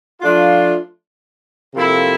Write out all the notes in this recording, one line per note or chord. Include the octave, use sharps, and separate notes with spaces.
F3 A3 D4 F4
C3 F3 A#3 E4 A4